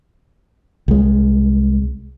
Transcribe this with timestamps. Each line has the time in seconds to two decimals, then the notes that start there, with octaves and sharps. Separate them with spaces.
0.88 C2 G#3